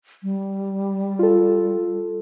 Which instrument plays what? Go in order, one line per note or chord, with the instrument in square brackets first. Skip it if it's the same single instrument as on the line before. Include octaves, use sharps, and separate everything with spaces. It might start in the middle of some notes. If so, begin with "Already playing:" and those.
[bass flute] G3
[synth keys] F4 A4